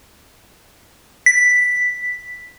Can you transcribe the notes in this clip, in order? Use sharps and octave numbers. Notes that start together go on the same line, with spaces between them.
B6